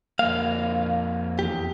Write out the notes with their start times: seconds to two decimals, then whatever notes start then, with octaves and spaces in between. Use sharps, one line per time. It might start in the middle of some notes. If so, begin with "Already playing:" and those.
0.19 F2 A#3 F5
1.39 E2 G4